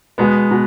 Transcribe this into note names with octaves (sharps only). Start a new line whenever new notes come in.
B2 G#3 B3
B2